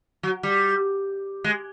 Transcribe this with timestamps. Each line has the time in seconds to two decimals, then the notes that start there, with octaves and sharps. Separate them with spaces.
0.23 F#3
0.43 G3
1.44 G#3